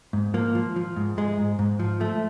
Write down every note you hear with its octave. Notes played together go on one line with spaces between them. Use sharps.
G#2
F3 A#3
F3
F3
G#2
G#2 G#3
G#2
G#2
F3
F3 A3